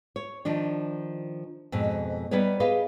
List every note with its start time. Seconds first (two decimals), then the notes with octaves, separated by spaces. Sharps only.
0.16 C#5
0.45 D#3 F3 D4
1.72 F2 G#2 B2
2.31 G3 B3 D#4 B4 C#5
2.60 G4 G#4 B4 D#5 F5